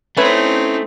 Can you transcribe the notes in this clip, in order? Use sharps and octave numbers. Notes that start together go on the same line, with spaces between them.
A3 C4 C#4 D#4 E4 B4 G#5